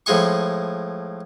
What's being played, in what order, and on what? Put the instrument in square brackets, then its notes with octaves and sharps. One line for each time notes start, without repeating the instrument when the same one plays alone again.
[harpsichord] A2 F3 G#3 G#5 C#6